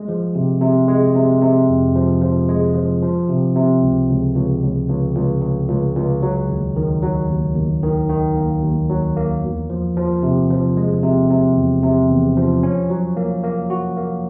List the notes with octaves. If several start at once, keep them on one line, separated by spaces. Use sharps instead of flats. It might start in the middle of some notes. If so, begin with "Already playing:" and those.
Already playing: G#3
F3
C3
C3
G#3
C3
C3
F2
F3
F3
G#3
F3
F3
C3
C3
C#2
C#2
C#2
C#2
C#2
C#2
C#2
C#2
C#2
F#3
D#2
D#3
F#3
D#2
D#2
D#3
D#3
A#3
D#2
F#3
A#3
E2
F3
F3
C3
F3
G#3
C3
C3
E2
C3
E2
F3
C#4
F#3
A#3
A#3
F#4
A#3